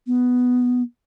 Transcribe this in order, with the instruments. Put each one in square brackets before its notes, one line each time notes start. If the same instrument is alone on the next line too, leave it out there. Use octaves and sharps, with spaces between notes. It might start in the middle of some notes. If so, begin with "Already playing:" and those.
[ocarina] B3